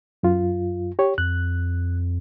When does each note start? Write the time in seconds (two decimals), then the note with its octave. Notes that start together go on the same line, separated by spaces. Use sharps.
0.23 F#2 F4
0.99 G4 C#5
1.18 F2 F#6